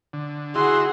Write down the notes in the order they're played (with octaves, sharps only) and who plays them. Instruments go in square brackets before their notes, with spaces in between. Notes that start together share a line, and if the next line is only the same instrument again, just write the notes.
[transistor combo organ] D3
[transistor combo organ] E4 F#4 [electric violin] G#4 F#5 [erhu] C6